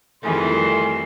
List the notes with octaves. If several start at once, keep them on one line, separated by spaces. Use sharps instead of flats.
F2 D#3 E3 G3 A3 G#4 C6